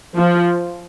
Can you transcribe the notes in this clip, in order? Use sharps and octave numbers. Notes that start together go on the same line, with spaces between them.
F3